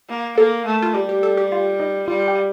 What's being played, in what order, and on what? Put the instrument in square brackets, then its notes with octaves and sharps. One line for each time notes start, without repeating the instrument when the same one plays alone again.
[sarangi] A#3
[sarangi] A#3 [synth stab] A4
[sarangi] A3
[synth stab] F4
[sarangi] G3 [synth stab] G4
[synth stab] G4
A4
G4
F4
D#4
[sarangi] G3 [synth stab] F4
[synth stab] G4